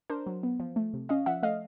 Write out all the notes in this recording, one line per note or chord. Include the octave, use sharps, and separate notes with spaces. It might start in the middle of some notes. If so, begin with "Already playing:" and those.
D4 A#4 C5
F#3
B3
F3
A3
C3
C#4 D#5 F5
F3 E5 F#5
A3 D#5 F5